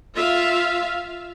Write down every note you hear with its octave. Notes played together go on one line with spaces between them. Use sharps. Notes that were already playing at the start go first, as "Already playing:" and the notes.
F4 E5 F5